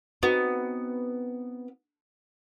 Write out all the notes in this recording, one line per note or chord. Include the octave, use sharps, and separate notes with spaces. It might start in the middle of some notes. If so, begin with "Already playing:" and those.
B3 C4 D#4 F#4